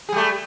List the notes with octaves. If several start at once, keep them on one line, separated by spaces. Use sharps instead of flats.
G3 A3 G#4